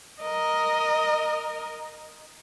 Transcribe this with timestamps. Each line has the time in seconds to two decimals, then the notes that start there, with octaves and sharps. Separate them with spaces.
0.22 A#4 D#5